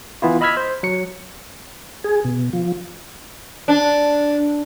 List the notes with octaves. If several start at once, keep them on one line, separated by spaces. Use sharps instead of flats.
E3 B3 E4 F4
D#5 B5 E6 F6 G#6 B6
C5
F#3 C#7
G#4
B2
F3
D4